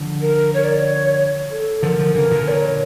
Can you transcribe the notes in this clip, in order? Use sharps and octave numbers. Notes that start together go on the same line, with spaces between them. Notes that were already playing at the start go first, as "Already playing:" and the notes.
Already playing: D3 F3
A#4
C#5
D5
D5
C#5
A4
D3 F3 A#4
D3 F3
C#3 E3 A#4
A#2 D3
D5
C#5